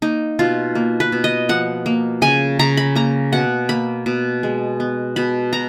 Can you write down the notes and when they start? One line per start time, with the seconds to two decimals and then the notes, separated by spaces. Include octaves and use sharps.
0.02 A#3 D#4
0.39 B2 F4
0.75 A#3
1.00 B4
1.12 B2
1.24 D#5
1.49 F3 F#5
1.86 A#3
2.22 C#3 G#5
2.59 C#3 A#5
2.77 B5
2.95 A#3 A#5
3.33 B2 F#5
3.69 A#3 B5
4.06 B2
4.43 G#3
4.80 B3
5.16 B2 B5
5.53 B2 A#5